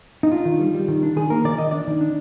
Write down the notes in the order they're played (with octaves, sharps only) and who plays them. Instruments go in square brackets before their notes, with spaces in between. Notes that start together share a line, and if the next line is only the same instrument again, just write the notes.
[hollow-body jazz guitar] D#4
D4 F4
D#3
G3
G3
D#3
D4
D#3 G#4
A#3 A#4
D#3 D5
D#3 D#5
D4 D5
D#3
D4